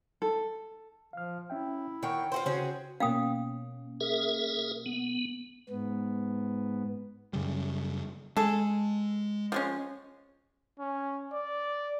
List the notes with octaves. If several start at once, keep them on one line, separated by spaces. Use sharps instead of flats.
A4
F3 F5 F6
C#4 E4 E5 G5
D#3 C#5 F#5 G5 C#6
F4 F#4 B4 C5
C#3 C4 C#4 F#4 G#4
B2 A#3 C#4 F5 G5 D#6
G#4 A#4 E5
B3
G#2 B3
F#2 C#3 G3
G#3 G#4 A4
F3 G#3 C#4
C#4
D5